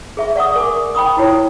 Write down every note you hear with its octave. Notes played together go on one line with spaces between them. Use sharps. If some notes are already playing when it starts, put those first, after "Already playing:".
G#4 E5 C#6
D5 F#5 C#6 D#6
A#4 G#5 C#6 D6
G5 B5 C#6 D#6
E4 F4 G4 C#5 G5